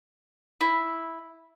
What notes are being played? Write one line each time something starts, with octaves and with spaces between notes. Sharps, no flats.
E4